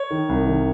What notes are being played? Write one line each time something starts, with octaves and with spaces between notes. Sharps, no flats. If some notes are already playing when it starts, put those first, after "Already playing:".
Already playing: C#5
D#3
C2
D#3